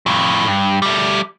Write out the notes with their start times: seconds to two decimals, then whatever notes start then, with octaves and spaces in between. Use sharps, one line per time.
0.06 F2 A2
0.47 G2
0.82 G3 A3